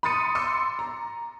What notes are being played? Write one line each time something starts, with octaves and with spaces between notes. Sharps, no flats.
B5 C6 D#6 A6 C#7 D#7
C6 D6 E6 C#7
A#5